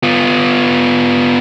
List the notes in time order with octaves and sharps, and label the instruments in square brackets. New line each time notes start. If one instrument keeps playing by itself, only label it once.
[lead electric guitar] B3 F4